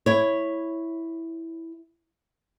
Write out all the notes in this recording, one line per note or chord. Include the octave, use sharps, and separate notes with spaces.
E4 C#5